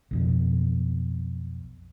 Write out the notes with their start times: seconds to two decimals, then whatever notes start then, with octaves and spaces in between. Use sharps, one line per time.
0.11 B1 F2 B2